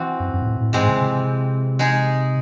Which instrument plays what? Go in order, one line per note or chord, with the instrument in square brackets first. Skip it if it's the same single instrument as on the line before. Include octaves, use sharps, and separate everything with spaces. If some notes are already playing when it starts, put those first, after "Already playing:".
Already playing: [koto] E3 C4 F#4
[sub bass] F#2
F#2
G#2
A2
A2
[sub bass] G#2 [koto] E3 G#3 C4
[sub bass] C#3
C3
[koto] G#3 D#4 G#4